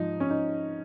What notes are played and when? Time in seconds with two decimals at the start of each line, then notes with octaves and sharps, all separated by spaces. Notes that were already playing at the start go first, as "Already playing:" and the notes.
Already playing: G#2 F3 D#4
0.20 C#4
0.30 D#4